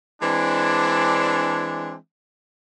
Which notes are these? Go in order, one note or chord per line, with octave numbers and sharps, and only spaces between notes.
E3 G#3 C4 D4